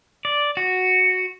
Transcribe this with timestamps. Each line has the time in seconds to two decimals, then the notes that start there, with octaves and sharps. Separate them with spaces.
0.25 D5
0.57 F#4